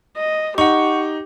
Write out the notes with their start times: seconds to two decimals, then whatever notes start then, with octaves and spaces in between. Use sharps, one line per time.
0.16 D#5
0.58 D#4 G4 F#5 C#6